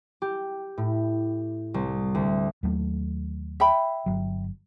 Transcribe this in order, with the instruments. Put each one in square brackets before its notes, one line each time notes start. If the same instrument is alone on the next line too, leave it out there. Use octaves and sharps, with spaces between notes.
[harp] G4
A2
C2
D2
[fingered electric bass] D#2 F#3 A3
[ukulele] E5 G5 B5
[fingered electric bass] G1 F#3